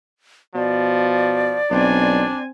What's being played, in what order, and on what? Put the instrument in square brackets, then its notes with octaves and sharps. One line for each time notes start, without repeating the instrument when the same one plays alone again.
[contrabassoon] B2 [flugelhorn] F3 [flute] D5
[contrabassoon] B1 [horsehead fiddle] C4 G#5 [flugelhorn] D4